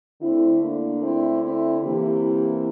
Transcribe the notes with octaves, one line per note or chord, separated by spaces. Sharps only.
D3 A3 C4 E4
A#3 D4
C4 E4
C4 E4
C3 E3 A#3 E4 G4